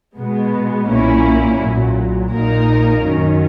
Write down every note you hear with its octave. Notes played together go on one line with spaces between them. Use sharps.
B2 G#3 B3
B1 A#2 A#3 C#4 E4
B1 A#2 F#3
A#1 A#2 A#3 D#4 A#4
F#2 D#3 F#3 C#4